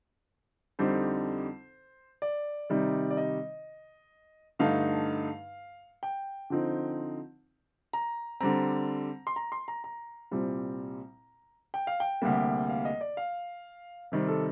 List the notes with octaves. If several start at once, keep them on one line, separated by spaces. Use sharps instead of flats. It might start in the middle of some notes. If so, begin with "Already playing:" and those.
F2 D3 G3 C4 D#4 C5
D5
C3 D#3 G3 C4 D#4
D5
D#5
G2 D3 A3 D#4 F5
G5
D3 F3 C4 D#4
A#5
D3 G3 C4 A#5
C6
A#5
C6
A#5
A#5
C2 A#2 G3 C4
G5
F5
G5
D2 C3 G3 A#3
F5
D#5
D5
F5
C3 D#3 G3 C4
A4